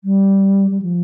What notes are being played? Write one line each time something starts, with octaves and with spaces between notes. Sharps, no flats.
G3
G3
F3